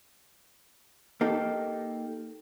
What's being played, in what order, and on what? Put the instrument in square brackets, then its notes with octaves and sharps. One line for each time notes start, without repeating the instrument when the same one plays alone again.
[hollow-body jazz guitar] A#3 D#4 G4 A4